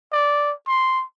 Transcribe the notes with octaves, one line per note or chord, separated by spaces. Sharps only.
D5
C6